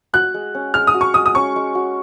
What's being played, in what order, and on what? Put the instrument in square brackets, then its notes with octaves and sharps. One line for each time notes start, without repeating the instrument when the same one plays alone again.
[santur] F#4 [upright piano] F#6
[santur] G#3
C#4
[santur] G#3 [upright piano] F6
[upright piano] D#6
[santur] F#4
[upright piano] C#6
[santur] G#3 [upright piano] D#6
[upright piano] D#6
[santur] C#4 [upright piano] C#6
[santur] G#3
F#4